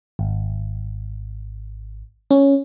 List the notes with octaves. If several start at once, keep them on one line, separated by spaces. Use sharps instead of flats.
G#1
C#4